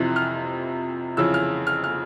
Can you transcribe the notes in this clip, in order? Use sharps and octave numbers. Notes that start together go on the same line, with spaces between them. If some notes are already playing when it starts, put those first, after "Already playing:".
Already playing: F2 C3 E3 F#6
F6
F2 C#3 E3 E6
F6
F6
F6